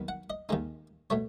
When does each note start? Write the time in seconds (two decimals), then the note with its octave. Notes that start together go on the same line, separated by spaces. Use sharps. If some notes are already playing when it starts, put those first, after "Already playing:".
Already playing: D#2 D#3 F#3 B3
0.08 F#5
0.30 D#5
0.49 D#2 D#3 G#3 D#4
1.10 B2 A3 C#5